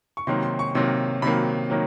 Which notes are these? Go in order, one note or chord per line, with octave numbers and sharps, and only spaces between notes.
C#6
C3 D#3 F#3 A#3 C6
C6
C#6
C3 D#3 F#3 A#3 C6
C3 D#3 F#3 A#3 B5
D#3 F#3 A#3